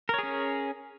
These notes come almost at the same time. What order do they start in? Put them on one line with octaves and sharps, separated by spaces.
A#4 C#5 G#4 C#4